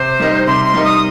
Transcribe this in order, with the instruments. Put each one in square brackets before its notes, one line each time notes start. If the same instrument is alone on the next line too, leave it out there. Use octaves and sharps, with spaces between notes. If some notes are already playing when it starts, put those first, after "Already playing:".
Already playing: [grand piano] C3 [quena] C5
[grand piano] G3 D#4 A#4 D#5
[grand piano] C3 [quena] C6
[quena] C6
[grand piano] G3 D#4 A#4 D#5
[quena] D#6